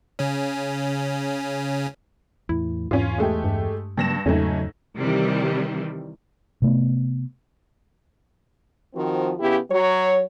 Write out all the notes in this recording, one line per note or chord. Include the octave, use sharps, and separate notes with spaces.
C#3 C#4
E2 A2 E4
E2 G#2 C#4 F4
G#3 A3 G4
G2
G2 C#3 F#3 A#3 A#6 E7
E2 G#2 C#3 F#3 A3 C#4
C3 D#3 E3 G3
C3 A3 B3
D#3 F3 C4 F#4
C#3 B3 E4 G4
F#3 C#5